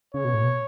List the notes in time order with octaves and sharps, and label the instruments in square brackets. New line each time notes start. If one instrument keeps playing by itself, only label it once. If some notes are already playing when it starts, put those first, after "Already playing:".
[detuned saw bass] C#3 [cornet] C#5
[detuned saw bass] B2
A2
B2